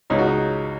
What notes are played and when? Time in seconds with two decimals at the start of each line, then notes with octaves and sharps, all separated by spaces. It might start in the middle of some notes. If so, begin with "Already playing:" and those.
0.10 C#2 C#3 D#4
0.19 F#4
0.27 D#4